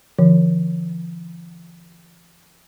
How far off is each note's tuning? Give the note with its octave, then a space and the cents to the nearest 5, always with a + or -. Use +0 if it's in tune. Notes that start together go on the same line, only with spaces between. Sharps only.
D3 +10 F3 -40